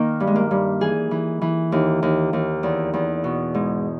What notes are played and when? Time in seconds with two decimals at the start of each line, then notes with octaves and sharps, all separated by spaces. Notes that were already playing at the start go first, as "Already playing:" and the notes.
Already playing: D#3 A#3
0.20 G2
0.27 G#3
0.36 A#3
0.51 G2
0.81 E3 G#4
1.11 E3
1.42 E3
1.72 D#2
2.02 D#2
2.33 D#2
2.63 E2
2.93 E2
3.24 B2
3.54 G#2